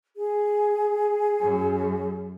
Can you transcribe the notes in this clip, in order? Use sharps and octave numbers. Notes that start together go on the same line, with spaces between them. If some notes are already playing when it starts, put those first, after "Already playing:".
G#4
F#2